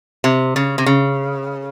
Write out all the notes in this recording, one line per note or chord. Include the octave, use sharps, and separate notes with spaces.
C3
C#3
C3
C#3